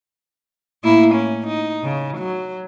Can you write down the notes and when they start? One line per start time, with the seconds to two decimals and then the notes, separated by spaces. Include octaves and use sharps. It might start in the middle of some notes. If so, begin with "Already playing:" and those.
0.84 A2 A#3 E4
1.15 C#4
1.48 D#4
1.83 C#3
2.18 F#3